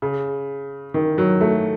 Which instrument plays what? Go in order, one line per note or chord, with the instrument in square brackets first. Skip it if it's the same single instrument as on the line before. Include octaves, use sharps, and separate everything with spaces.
[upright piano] C#3
D#3
F#3
A3